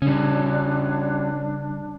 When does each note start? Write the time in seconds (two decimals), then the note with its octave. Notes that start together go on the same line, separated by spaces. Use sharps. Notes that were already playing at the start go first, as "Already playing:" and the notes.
0.02 C#3 G3 C#4 D4